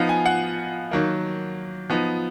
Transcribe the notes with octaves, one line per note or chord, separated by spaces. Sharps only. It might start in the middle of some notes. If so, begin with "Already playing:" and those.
Already playing: F3 B3 D#4 F5
G#5
F#5
D#3 F#3 A#3
F3 B3 D#4